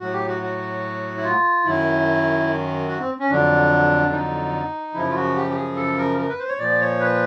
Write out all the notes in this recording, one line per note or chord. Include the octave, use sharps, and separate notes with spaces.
A2 F#3 F#4
G4
F#4
F#4
E4
F4
F#2 D#3 F#3 E4
F#4
C4
C#4
F2 D3 F#3 D4
D#4
F#2 C#3 F3 E4
F4
F#4
G4
G4
G#4
A4
A#4
A#4
B4
C5
C#5
A#2 F3 D5
C#5
B4